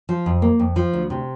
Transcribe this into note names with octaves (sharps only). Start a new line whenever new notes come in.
F3
F2
A#3
F2
F3
D2
C3